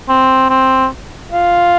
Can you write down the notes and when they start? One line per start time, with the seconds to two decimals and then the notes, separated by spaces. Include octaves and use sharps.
0.09 C4
0.50 C4
1.32 F4